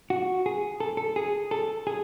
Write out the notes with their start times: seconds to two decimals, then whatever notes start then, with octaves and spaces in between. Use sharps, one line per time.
0.10 F#4
0.46 G#4
0.80 A4
0.97 A4
1.16 G#4
1.51 A4
1.87 G#4